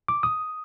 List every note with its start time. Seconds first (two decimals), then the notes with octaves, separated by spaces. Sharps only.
0.08 D6
0.23 D#6